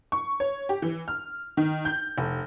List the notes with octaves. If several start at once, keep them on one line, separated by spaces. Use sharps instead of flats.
C#6
C#5
G4
E3
F6
D#3
G6
F1